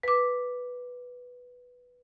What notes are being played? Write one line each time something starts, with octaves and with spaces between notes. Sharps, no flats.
B4 D6